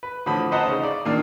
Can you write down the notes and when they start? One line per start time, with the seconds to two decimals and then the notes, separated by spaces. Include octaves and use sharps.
0.03 B4
0.26 A2 D3 F3 B5 D#6
0.51 B4 C5 D#5 F#5 A5 A#5
0.66 C#3 C#4 D#4
0.83 D5
1.05 A#2 D#3 D4 F5